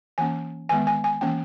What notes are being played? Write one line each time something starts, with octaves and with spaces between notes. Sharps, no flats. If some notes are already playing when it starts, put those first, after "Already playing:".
E3 A#3 C#4 G#5
D#3 G#3 B3 G#5
G#5
G#5
E3 A#3 C#4 G5